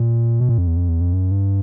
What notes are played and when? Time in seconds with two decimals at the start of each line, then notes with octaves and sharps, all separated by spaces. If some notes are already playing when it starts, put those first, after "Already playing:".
Already playing: A#2
0.40 B2
0.49 A#2
0.58 F2
0.67 E2
0.76 F2
0.89 E2
1.01 F2
1.13 F#2
1.31 G2